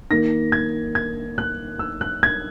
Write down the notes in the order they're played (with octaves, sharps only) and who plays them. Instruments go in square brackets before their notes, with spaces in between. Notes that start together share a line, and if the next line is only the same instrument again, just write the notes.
[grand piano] D#3 A#3 A#6
G#6
G#6
F#6
E6
F#6
G#6